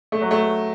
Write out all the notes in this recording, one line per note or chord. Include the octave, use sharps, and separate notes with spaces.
A3
F#3
A3